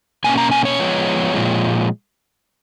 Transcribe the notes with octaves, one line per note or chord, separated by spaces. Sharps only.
B2 A#3 C#4 G#5
A#5
G#5
C#5
F3 G#3 B3
A#2 F3 G#3